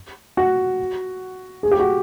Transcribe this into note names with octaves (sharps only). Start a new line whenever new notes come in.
F#4
G#4
G4
F#4